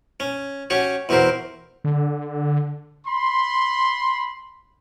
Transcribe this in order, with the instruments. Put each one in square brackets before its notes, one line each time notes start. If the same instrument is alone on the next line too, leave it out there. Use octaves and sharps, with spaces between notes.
[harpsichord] C#4
C#4 F#4 G4 C#5
E2 C4 F#4 G4 A#4 C5
[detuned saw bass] D3
[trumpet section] B5 C6